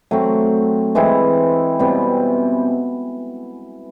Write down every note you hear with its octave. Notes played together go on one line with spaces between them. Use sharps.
F#3 A3 C4
E3 G#3 C4 E4
B2 G3 C4